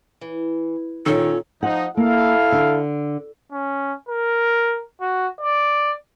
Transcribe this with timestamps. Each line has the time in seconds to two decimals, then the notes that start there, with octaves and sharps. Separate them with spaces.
0.21 E3
1.06 A#2 D#3 C#4 F4 A4
1.63 F3 D#4 F#5
1.97 A#3 E4 A4 F5
2.52 D3
3.52 C#4
4.08 A#4
5.01 F#4
5.40 D5